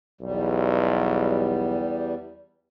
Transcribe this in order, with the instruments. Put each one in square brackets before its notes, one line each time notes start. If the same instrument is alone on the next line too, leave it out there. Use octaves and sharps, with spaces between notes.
[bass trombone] B1 [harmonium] E2 G3